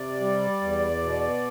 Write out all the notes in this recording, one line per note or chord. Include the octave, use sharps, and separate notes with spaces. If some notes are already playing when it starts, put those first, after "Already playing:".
Already playing: C3 D5
G3
E2
B2